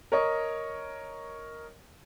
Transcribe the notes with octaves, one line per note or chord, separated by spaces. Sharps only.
A#4 C#5 D#5